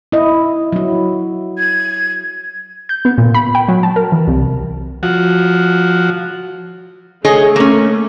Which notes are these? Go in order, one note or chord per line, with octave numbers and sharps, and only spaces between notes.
E4 D#5
F#3 E4
G#6
G6
B3
A#2
B5
G5
F#3
A5
A#4
E3
C2
F3 F#4
A3 G#4 C#5 D#5
A#3 C#4